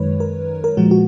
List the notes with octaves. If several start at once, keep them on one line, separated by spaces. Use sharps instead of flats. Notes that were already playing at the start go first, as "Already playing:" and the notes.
Already playing: F#2 D#3 G#3 B4 C#5
A#4
A#4
A#2 F3 G#3 F#4
F#4